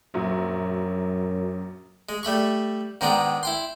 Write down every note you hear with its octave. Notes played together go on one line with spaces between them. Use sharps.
A#1 F#2 F#3
G#3
G3 A3 B5 C#6
G#2 D#3 G#3 B3 D4 G5
E4 G5 C6